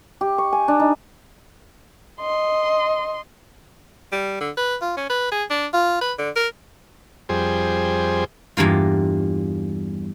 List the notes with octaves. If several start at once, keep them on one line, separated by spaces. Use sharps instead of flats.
G4
C#6
G#5
D4
D#4
D#5 C6
G3
D3
B4
F4
C#4
B4
G#4
D4
F4
B4
D3
A#4
F2 G3 G#4 C5
E2 G2 A#3 F4